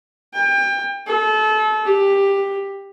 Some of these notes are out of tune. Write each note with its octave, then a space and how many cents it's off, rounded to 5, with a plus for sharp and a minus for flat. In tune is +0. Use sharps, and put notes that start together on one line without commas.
G5 +30
A4 -30
G4 +10